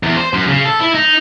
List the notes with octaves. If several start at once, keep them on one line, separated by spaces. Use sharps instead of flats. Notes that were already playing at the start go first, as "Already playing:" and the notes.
E2
C5
F#2
C#3
A4
E4
D#4